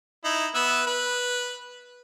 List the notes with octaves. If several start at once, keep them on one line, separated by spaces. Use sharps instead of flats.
D#4 E4
B3 B4 E5
B4